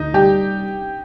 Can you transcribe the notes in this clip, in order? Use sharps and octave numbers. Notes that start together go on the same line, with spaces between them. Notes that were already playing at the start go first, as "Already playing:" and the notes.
Already playing: D2 D#4
G3 G4